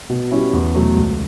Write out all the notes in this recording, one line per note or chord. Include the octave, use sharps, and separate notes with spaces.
B2
G3 C#4 E4
E2
B2 F#3 A3
C#2